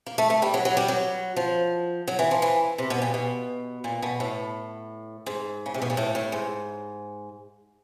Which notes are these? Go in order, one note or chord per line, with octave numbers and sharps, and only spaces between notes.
A#3
A3
A3
G3
F#3
F#3
G3
F#3
F3
F#3
E3
F3
E3
C3
B2
A#2
B2
A#2
B2
A2
G#2
C#3
C3
B2
A#2
A2
A2
G#2